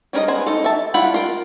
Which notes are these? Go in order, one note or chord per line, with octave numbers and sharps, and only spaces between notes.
G3 C#4 A#4 B4 D#5
B3 C5 G#5
D#4 A4
E5 A5
G3 E4 F4 F#5 B5
F4 A#4